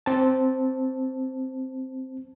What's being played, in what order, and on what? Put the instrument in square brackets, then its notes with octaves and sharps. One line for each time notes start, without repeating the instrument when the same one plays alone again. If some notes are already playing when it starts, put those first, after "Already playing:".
[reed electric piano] C4 A5